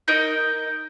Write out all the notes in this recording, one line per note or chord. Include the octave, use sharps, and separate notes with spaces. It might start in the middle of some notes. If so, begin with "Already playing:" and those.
D#4 A#4 D#5